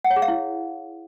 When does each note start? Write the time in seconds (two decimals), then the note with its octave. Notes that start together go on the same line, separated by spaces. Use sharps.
0.04 F#5
0.10 C#5
0.16 G#4
0.22 F5
0.28 E4